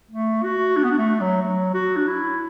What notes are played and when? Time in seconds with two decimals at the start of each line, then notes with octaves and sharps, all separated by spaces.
0.11 A3
0.44 F#4
0.76 D4
0.84 B3
0.91 D4
0.98 A3
1.21 F#3
1.42 F#3
1.74 F#4
1.96 D4
2.07 E4